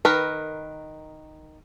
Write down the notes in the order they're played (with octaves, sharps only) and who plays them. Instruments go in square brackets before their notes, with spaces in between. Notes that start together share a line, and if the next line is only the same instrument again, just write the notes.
[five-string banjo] D#3 A#4 B4